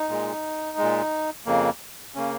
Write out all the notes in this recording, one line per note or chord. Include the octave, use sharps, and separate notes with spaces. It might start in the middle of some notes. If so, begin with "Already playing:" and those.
Already playing: D#4
A#2 G#3
A#2 G#3
F2 C#3 A#3
C#3 A#3 C#4